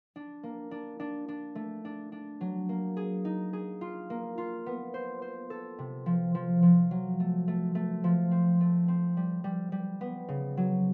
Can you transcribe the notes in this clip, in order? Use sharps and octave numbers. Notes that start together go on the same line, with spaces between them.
D4
A#3
D4
D4
D4
A3
D4
D4
F#3
A#3
G#4
D#4
G#4
F4
A#3
F4
B3
C5
C5
A4
C3
F3
F3
F3
F#3
A3
A3
A3
F3
C4
A3
C4
G3
G3
G3
B3
C#3
F#3